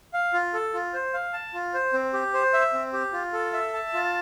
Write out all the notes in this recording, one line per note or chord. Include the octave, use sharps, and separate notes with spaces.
F5
F4
A4
F4
C5
F5
A5
F4
C5
C4
G4
C5
E5
C4
G4
F4
A4
E5
A5
F4